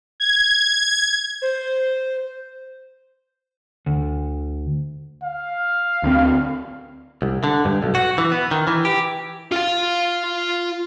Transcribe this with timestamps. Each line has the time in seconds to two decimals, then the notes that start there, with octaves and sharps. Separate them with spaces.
0.20 G#6
1.42 C5
3.86 D2
5.23 F5
6.03 D2 C4
7.22 C2
7.44 D3
7.65 G2
7.83 B1
7.95 F#4
8.18 E3
8.32 B3
8.51 D#3
8.67 E3
8.85 G4
9.52 F4 F5